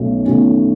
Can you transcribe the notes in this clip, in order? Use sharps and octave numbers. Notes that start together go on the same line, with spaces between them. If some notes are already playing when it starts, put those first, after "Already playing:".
Already playing: B1 B2 F#3 A3 C#4
B1 B2 F#3 A3 C#4